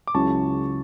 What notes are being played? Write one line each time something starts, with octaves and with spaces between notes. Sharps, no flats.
D6
C#2 C#3 F#3 C#4 E4 A5 C#6